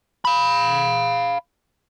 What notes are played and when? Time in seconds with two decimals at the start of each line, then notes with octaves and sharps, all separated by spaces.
0.25 F5 B5